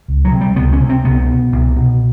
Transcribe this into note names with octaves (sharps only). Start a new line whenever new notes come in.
C#2
F#3
C3
G3
C#2 B3
C#4
C3
C4
C2 B3
B2
C2
B2